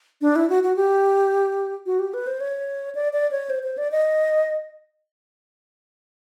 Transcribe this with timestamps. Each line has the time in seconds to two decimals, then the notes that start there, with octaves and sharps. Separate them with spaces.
0.21 D4
0.36 E4
0.49 F#4
0.63 F#4
0.76 G4
1.86 F#4
1.99 G4
2.14 B4
2.27 C5
2.40 C#5
2.95 D5
3.13 D5
3.31 C#5
3.50 C5
3.63 C5
3.78 D5
3.92 D#5